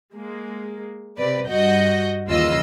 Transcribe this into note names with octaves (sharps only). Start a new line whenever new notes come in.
G#3 A#3
C3 B4 D5
G2 F#4 D#5 G6 A#6
D#2 C#3 E3 F4 D#5 E6